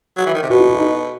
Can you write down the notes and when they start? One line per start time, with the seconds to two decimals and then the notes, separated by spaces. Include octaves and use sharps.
0.17 F#3
0.26 E3
0.34 D#3
0.42 C3
0.50 B2 F#4
0.59 E4
0.69 E4
0.79 D#4